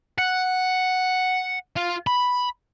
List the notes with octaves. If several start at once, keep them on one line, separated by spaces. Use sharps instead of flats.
F#5
F4 F5
B5